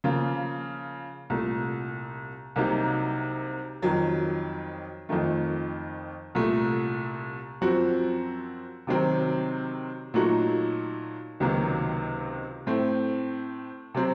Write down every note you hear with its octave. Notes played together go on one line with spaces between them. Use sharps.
C#3 F3 A#3 F4
C2 A#2 A3
C2 C3 F#3 A#3 D#4
F2 D#3 F#3
F2 D#3 A3
C2 A#2 A3
F#2 F3 C4 F#4
C3 D#3 F#3 C4
A#2 F#3 A3 D#4 F#4
C#2 C3 D#3 F#3 A#3
A2 A3 C4
C3 F#3 C4